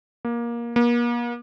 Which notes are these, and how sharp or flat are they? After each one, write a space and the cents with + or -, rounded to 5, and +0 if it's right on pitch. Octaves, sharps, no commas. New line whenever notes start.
A#3 +20
A#3 +40